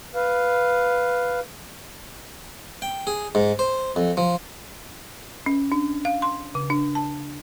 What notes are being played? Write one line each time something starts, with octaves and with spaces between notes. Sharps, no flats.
B4 F5
G5
G#4
G#2
C5
F2
F3
C#4
D4
F5
C6
C#3
D4
A5